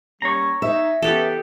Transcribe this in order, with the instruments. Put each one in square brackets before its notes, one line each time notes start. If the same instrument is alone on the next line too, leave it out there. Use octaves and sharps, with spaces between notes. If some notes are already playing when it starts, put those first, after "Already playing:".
[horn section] G3 A#3 C#4 [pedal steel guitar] C#5 A#5
[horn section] D#4 [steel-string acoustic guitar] E5
[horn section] C#3 E3 B3 [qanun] G4 A4